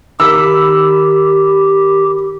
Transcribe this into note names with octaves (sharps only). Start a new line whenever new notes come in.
D#3 G4 A#4 B5 E6